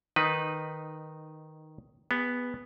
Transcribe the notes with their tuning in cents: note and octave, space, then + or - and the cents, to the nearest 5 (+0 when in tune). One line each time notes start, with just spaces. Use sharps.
D#3 +0 D#4 -15 B4 +0
B3 +0 G#4 -40